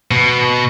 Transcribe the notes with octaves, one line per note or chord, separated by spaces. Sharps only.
B2